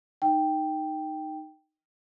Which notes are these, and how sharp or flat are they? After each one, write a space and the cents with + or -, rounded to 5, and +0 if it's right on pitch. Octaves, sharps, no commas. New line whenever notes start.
D#4 -5 G5 +0